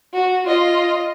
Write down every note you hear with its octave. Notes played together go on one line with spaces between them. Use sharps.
F#4
F4 D#5